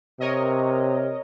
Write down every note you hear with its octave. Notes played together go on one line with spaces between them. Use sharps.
C3 A#4 C#5 D#5